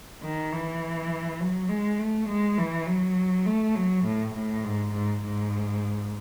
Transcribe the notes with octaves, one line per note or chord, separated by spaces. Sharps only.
D#3
E3
F#3
G#3
A3
G#3
E3
F#3
A3
F#3
A2
A2
G#2
G#2
G#2